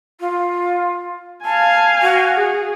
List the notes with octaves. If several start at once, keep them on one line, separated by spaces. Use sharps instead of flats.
F4
F5 G#5 A5
F#4
G#4